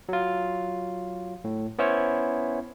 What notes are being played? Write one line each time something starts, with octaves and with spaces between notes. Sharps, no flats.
F#3 F4
A2
B3 C#4 E4 C5 C#5